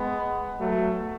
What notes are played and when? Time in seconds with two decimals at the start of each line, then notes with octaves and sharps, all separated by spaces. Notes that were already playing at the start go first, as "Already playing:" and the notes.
Already playing: G#3 B3
0.59 F#3 A3